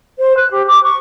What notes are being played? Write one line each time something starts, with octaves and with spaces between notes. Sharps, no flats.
C5
F#6
G4
D6
C#6